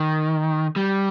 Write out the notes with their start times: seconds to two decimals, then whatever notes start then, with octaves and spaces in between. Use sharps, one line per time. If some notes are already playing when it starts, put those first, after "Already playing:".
Already playing: D#3
0.76 G3